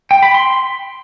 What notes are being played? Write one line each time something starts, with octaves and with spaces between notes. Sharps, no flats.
G5
B5
C6